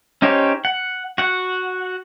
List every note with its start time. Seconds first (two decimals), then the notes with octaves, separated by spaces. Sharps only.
0.22 C#4 D#4 G4 C5 C#5
0.65 F#5
1.18 F#4 F#5